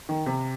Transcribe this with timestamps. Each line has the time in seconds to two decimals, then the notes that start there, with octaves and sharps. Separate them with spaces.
0.09 D#3
0.26 C3